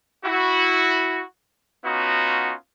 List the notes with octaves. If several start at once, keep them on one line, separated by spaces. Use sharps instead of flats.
E4 F#4
B3 C#4 D#4 F4 F#4